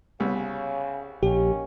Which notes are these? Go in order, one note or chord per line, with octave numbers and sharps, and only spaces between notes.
C2 C#3 B3
A#1 D#3 A#3 C#4 G4